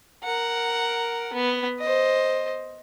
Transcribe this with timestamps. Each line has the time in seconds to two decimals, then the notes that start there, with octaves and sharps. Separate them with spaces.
0.24 A#4 F#5
1.33 B3
1.80 C5 D#5